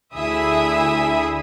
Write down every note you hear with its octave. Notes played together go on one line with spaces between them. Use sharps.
D2 D3 E4 G#4 E5 D#6